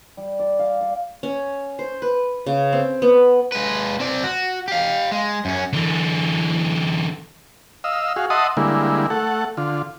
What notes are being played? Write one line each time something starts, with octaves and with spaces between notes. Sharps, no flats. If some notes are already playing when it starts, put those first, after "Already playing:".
G3
D5
F5
D5
C#4
C5
B4
C#3
C4
B3
G#3 B4
C4 D5
F#4
G4 F5
G#3
F#2 C#4
D3 E3
D#5 F5 E6
F#4 G#4 F5
D#5 E5 F#5 A5 C6 D#6
D3 G3 G#3 A#3 E4
A3 A4 F#5
D3 F4